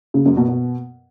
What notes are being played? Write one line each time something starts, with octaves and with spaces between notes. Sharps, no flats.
C#3
F#2
B2
B2